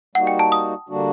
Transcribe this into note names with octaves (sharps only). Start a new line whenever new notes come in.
G3 A#3 D#4 F#4 F#5
G5
A5
D#6
D3 G3 A#3 D4 F#4